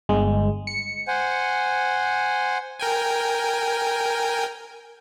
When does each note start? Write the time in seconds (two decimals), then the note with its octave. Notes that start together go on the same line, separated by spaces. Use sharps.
0.09 G1 G#3
0.67 C#7
1.08 C5 F#5 G#5
2.79 A#4 G5 G#5